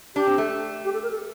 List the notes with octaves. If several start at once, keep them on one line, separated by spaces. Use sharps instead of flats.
D4 G4
C4
A3
G4
A4
A#4
A4